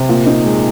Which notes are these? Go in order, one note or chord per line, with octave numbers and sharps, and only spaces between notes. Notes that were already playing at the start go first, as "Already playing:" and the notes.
Already playing: C3
A#2
D#4
G#3